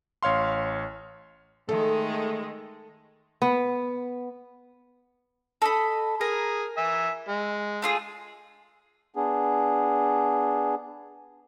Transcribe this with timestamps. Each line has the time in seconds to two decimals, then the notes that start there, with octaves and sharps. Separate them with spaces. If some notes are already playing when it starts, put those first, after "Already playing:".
0.23 A1 C#5 F5 C6
1.69 D#3 G#3 A3 A4
3.42 B3
5.62 A4 D#5 B5
6.21 G#4 A#4
6.77 E5 G#5
7.29 G#3
7.82 A3 F4 G#4
9.16 B3 D4 G#4